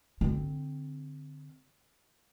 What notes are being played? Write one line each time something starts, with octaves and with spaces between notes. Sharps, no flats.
D3 C4